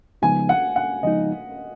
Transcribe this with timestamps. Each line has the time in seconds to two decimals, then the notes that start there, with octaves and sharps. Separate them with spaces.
0.22 C#3 F3 G#3 B3 D#4 G#5
0.49 F#5
0.76 F#5
1.03 C#3 F3 G#3 B3 D#4 D#5